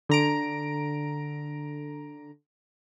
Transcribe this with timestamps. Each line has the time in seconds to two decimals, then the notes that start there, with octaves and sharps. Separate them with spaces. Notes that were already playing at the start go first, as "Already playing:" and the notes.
0.09 D3 A#5 D7